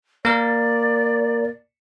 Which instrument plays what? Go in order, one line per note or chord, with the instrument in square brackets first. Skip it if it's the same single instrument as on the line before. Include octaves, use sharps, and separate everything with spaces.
[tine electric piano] A#3 A#4 [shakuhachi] D5